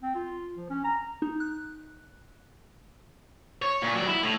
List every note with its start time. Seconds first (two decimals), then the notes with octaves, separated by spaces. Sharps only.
0.02 C4
0.15 F4
0.56 F3
0.70 C#4
0.84 A#5
1.22 D#4
1.40 F#6
3.62 C#5
3.81 A#2
3.94 F#3 D5
4.07 E4
4.23 A2